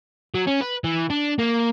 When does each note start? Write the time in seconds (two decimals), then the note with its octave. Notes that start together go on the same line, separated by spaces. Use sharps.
0.34 F#3
0.47 C#4
0.61 B4
0.84 E3
1.10 D4
1.39 A#3